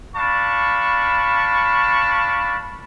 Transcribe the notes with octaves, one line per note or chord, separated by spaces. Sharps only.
D4 F5 A5 B5 C#6